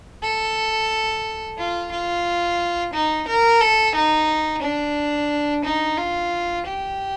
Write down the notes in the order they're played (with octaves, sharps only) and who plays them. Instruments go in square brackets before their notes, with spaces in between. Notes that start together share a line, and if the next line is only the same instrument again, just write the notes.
[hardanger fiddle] A4
F4
F4
D#4
A#4
A4
D#4
D4
D#4
F4
G4